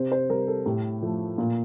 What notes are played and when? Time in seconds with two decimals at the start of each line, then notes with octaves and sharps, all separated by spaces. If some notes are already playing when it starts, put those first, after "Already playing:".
Already playing: C3 C5
0.12 C5
0.29 G3 A#4
0.48 A4
0.66 A2 G4
1.02 F3 A3
1.38 A#2 F4